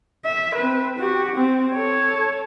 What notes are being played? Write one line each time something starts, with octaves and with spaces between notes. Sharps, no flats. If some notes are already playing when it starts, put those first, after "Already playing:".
E5
C4 B4
F#4 G4
C4
A4 C#5